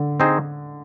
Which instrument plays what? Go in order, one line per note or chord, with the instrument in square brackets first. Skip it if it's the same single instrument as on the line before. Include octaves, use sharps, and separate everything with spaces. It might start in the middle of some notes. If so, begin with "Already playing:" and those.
Already playing: [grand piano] D3
[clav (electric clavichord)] C4 D#4 G#4 C5